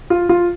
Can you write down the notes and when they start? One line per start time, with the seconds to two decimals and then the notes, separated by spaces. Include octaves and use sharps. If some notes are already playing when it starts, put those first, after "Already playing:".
0.10 F4
0.29 F4